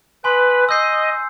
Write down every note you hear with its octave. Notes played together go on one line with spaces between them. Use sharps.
B4 G#5 C6 D#6
D#5 E6 G6 C7